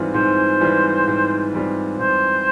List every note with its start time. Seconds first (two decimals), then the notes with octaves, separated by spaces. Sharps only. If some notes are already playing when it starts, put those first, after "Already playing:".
Already playing: G#2 E3 G3 C4 F4
0.14 G#2 C5
0.61 E3 G3 C4 F4
1.08 G#2
1.52 E3 G3 C4 F4
1.99 G#2 C5